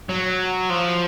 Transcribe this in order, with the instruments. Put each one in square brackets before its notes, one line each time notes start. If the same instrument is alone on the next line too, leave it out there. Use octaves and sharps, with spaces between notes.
[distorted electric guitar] F#3
F3